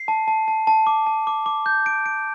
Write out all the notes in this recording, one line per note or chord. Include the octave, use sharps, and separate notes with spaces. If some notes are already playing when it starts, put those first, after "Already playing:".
Already playing: C7
A5
A5
A5
A5
D6
A5
D6
D6
G6
D7
D7